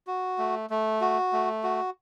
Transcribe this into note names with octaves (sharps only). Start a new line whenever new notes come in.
F#4
A3
A3
F#4
A3
F#4